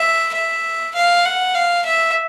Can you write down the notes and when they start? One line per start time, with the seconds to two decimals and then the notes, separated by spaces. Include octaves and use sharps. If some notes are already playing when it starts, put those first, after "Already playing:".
Already playing: E5
0.35 E5
0.95 F5
1.25 F#5
1.55 F5
1.85 E5